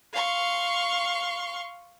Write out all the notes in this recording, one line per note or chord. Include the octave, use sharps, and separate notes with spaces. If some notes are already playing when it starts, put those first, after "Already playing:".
F5 C6 C#6